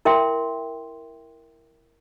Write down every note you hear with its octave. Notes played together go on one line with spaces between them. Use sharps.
E4 A#4 E5 G5 C6